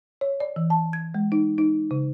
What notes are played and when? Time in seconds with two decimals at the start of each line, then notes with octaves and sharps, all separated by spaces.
0.21 C#5
0.40 D5
0.56 E3
0.70 A5
0.93 G#6
1.14 G#3
1.32 D#4
1.58 D#4
1.91 C#3